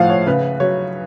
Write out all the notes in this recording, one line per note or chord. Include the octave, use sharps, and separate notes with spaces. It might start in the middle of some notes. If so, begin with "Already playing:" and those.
Already playing: A2 F3 F5 F#5
C#5
C#3 B4
F#3 C#5